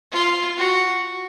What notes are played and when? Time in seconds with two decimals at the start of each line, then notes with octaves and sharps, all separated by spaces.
0.12 F4
0.57 F#4